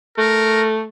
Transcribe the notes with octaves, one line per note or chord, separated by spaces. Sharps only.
A3 A#4